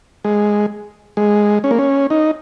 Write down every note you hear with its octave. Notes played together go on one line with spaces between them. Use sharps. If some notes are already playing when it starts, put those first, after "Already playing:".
G#3
G#3
C#4
A#3
C#4
D#4